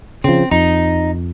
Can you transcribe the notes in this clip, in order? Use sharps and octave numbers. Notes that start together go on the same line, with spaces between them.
C#3 F3 C4
F2 D#4